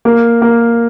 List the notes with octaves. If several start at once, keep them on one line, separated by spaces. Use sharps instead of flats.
A#3
A#3